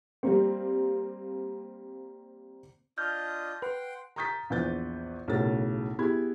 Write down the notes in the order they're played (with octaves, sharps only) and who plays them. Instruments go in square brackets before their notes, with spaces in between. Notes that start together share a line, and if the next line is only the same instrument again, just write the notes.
[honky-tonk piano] G3 A#3 C4
[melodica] D4 F4 D#5 [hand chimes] F6 G6
[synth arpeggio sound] B4 [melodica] F#5 G5 C6
[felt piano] A#5 C#6 D#6 G6 A6 B6
A#1 E2 B4 G6 A6
B1 A2 C#3 A#4 A6
B3 E4 G4 G#4 B5 G#6